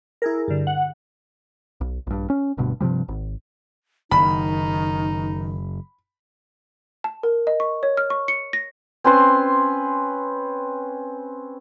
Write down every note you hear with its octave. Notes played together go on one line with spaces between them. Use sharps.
E4 G#4 A#4
G2 D3
F#5
B1
A#1 G2
C#4
D1 D2 G2 B2
G2 C3 F3 G3
G#1
F#1 D#3 D#4 B5
A5
A#4
D#5
C#6
C#5
F6
C#6
C#7
A#6
C4 C#4 B4 C6